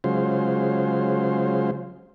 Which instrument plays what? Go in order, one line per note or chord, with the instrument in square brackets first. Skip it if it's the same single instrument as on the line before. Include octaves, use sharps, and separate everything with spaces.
[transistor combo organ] C#3 F#3 G#3 F4 C5